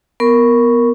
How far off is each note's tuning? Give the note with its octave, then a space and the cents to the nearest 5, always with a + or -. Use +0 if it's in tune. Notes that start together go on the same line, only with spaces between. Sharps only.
B3 +0 A#4 +0 C#6 +0